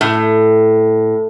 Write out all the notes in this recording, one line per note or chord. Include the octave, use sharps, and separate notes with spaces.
A2